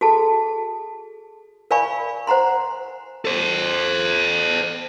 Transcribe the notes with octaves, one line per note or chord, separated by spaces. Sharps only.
F#4 G#4 A4 A5
A#4 D5 F5 G#5 B5 C#6
C5 F#5 A#5 C6
A4 C5